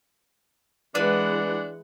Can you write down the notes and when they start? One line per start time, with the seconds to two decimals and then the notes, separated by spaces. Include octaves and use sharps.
0.95 E3 G#3 B3 D4 B4 D5 F#5